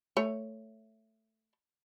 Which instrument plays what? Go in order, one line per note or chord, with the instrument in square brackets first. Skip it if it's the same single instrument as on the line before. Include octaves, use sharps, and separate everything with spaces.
[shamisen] A3 C#5